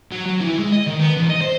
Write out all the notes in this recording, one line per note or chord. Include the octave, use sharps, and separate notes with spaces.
F#3
F#3
E3
G#3
D#5
D#3
B3
E2
D#5
C5